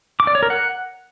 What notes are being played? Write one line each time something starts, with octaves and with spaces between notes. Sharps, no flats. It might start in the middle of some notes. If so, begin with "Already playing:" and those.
D6
D5
C#5
A#4
F#5